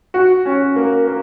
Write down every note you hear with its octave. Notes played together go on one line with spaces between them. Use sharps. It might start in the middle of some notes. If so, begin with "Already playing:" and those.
F#4
C#4
A#3
A#3